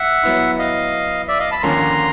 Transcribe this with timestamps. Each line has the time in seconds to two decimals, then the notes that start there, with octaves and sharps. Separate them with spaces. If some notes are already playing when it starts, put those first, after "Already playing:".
Already playing: E5 F#5
0.23 F#3 B3 E4
0.59 D#5 F5
1.28 D5 E5
1.39 D#5 F5
1.51 A5 B5
1.62 D#2 D3 F3 A#3 C#4 A#5 C6